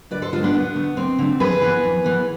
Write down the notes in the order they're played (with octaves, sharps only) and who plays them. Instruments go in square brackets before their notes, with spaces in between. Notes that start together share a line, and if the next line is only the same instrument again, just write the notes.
[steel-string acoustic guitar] D2 B4 D5
A4 C5
D3 G#3 F4 A4
B3 D4
D2 B3
D3 A3
D2 C4
D3 A3
F2 G#4 B4
E3 B3
F2
E3 B3